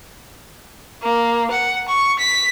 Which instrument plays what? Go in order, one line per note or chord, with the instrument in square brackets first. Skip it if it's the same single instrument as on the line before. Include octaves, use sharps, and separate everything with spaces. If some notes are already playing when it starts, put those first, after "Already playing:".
[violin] A#3
F#5
C#6
B6